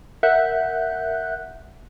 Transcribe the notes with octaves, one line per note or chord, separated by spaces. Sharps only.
A#4 E5 F#5 F#6 G6